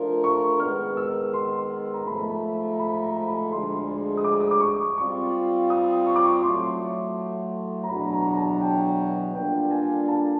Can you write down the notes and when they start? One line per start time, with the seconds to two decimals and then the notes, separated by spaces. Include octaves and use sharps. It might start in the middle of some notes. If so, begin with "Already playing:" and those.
Already playing: F3 A3 D4 F4 A#4
0.24 C#6
0.60 D#3 G#3 B3 F6
0.97 E6
1.34 C6
1.94 A#5
2.06 G#2 F3 A3 B5
2.73 A#5
2.79 B5
3.02 A#5
3.28 B5
3.52 D2 D3 F3 G#3 C6
4.17 D#6
4.24 D6
4.40 D#6
4.51 D6
4.60 C#6
4.98 G3 C4 F4 C#6
5.70 D#6
6.07 C#6
6.16 D6
6.25 C#6
6.43 A2 F#3 A3 C6
7.83 A#5
7.89 E2 B2 F#3 B3 D4 B5
8.13 A#5
8.27 A#5
8.37 A5
8.61 G5
9.34 G3 A#3 D4 F4 A4 G5
9.71 G#5
10.08 A5